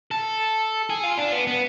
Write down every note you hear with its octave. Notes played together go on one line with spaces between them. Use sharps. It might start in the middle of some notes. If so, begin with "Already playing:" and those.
A4
G#4
F4
D4
B3
B3